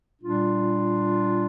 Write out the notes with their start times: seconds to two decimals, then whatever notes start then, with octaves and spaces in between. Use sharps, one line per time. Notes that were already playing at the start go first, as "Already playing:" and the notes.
0.21 A#2 G3 D4 F4